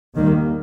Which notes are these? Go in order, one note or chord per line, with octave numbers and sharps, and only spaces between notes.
D#2 D#3 G3 A#3